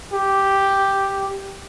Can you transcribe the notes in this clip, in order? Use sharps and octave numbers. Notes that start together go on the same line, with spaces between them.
G4